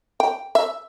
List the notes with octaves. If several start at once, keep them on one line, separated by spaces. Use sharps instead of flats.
G5
E5